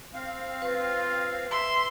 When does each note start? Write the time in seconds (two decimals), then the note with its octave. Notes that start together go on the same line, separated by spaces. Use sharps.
0.14 C4 F5
0.62 F4 B4
1.51 E5 C6